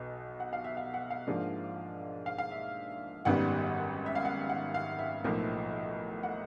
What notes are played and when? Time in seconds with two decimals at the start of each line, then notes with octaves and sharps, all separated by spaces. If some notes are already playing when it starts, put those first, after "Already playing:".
Already playing: B1 B2
0.40 F#5
0.53 F5
0.64 E5
0.77 F5
0.94 F#5
1.10 F5
1.27 G#2 F3 A#3 D4
2.26 F5
2.38 F5
2.51 E5
3.25 G#1 F#2 D#3 G3 B3 F#5
4.06 E5
4.15 F5
4.25 F#5
4.49 F#5
4.74 F5
4.99 E5
5.24 B1 A2 F3 A#3 D#4
6.23 F#5